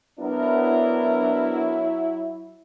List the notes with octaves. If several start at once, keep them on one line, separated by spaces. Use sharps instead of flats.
F#3 B3 D4 E4 A#4